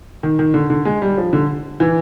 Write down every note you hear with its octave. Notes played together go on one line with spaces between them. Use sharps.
D#3
D#3
D3
D3
G#3
G3
F3
D3
E3